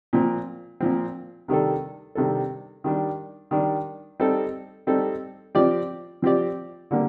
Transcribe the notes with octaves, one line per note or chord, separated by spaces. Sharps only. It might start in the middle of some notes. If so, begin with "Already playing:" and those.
A#2 F3 C4
A#2 F3 C4
C3 D#3 G3 D4 A4
C3 D#3 G3 D4 A4
D#3 G3 D4
D#3 G3 D4
G3 C4 D#4 A4
G3 C4 D#4 A4
F3 C4 G4 D5
F3 C4 G4 D5
D3 G3 A#3